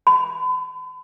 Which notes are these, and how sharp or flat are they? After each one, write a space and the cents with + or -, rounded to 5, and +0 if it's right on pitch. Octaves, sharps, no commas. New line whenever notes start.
B5 +45